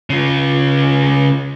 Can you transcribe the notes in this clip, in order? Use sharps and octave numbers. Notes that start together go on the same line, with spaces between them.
C#3 F4